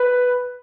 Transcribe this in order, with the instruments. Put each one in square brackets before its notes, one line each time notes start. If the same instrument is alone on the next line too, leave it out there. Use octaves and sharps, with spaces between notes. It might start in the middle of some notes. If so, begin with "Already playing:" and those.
Already playing: [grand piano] B4